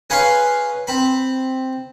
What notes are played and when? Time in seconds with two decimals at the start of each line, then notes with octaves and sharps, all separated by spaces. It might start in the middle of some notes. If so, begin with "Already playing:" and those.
0.10 C#4 G#4 B4 C#5 F5 C6
0.87 C4 B5